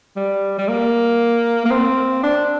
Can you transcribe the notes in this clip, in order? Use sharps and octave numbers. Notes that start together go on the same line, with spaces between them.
G3
G3
A#3
A#3
C4
D4